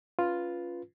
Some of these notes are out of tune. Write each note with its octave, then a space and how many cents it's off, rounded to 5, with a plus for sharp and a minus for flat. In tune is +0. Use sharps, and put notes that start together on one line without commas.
C#4 +20 F4 +0 B4 +0